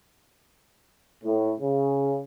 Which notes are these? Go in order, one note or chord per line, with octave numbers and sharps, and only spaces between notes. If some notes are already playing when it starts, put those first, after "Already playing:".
A2
C#3